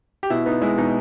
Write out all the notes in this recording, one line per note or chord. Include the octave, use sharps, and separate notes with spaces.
G4
B2 E4
B3 D#4
G#3 E4
B2 D#4